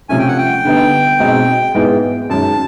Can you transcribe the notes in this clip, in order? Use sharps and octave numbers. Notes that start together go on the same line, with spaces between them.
C3 F3 A3 C#4 G#5
G5
F#5
G5
D3 G3 B3 D#4
B2 G#3 C4 D#4
G#2 E3 G#3 B3 E4
F#2 D#3 G#3 A5